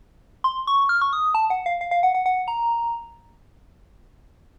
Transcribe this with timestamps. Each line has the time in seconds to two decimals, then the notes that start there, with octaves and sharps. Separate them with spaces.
0.44 C6
0.67 C#6
0.89 F6
1.02 C#6
1.13 D#6
1.35 A5
1.50 F#5
1.66 F5
1.81 F5
1.91 F5
2.03 F#5
2.15 F#5
2.26 F#5
2.48 A#5